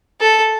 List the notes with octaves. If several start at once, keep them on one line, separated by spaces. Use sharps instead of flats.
A4